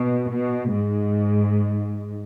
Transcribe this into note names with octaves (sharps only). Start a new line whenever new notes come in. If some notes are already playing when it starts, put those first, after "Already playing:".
Already playing: B2
B2
G#2